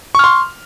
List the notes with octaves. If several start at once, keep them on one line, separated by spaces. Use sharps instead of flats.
C6 C#6 F6